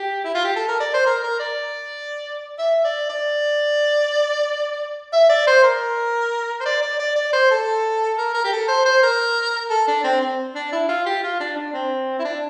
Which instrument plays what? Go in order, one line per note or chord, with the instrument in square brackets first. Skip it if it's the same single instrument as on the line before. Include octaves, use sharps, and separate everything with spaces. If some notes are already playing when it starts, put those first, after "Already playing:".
Already playing: [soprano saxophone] G4
E4
F4
G4
A4
A#4
D5
C5
A#4
A#4
D5
E5
D5
D5
E5
D5
C5
A#4
C5
D5
D5
D5
D5
C5
A4
A#4
A#4
G4
A4
C5
C5
A#4
A4
D4
C4
C4
D4
E4
F4
G4
F4
D4
D4
C4
E4
D4